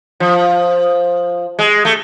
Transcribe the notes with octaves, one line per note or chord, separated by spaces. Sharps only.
F3
G#3
A3